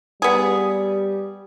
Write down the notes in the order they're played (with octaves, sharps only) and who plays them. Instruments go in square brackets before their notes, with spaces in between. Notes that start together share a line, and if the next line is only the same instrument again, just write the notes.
[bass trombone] G3 [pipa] B3 G#4